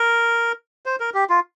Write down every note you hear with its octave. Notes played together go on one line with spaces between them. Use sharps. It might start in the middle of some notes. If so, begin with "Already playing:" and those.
Already playing: A#4
C5
A#4
G4
F4